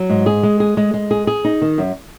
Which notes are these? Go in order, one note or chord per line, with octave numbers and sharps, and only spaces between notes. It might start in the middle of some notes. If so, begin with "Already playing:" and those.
Already playing: F#3
G#2
G#4
G#3
G#4
G#3
G#3
G#4
G#4
D#4
D#3
F#2